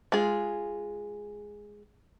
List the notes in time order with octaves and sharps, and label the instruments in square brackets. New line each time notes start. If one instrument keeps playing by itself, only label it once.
[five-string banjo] G#3 F4 G#4